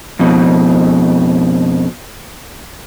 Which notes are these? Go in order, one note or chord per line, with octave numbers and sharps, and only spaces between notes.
F2 B2